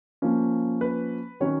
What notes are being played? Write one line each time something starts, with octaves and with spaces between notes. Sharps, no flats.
F3 A#3 C#4
B4
D#3 F#3 C#4 C#5